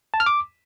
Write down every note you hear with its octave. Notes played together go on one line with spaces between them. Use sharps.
A5
F6
D6